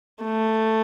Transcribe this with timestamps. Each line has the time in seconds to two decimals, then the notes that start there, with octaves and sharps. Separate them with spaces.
0.23 A3